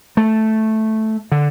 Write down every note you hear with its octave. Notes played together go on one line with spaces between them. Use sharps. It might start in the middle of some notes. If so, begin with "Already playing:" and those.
A3
D3